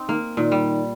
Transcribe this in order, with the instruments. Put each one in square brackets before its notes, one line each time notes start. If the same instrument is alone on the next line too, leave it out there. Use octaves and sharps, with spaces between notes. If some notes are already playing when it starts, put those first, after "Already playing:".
Already playing: [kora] C4 D#4
[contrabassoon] D#3 [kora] A#3
[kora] A#2 [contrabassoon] D#3
[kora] G3